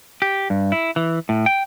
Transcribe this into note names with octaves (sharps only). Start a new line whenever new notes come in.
G4
G2
E4
E3
A2
G5